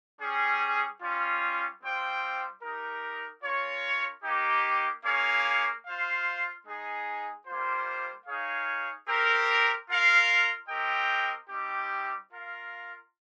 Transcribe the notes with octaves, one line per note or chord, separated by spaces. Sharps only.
G3 C#4 G#4
G3 C#4 F4
G3 C4 F4 C5 G5
D#4 G4 A#4
C#4 F4 A#4 C#5
A#3 D#4 G4
A#3 C#4 G#4 C#5 F5
F4 C5 F5
G#3 D#4 G#4
G3 A#3 F4 C5
D#4 G#4 C#5 F5
C4 G4 A#4
F4 A#4 F5
C4 G4 A#4 D#5 G5
G3 C4 D#4 G4
F4 A#4 F5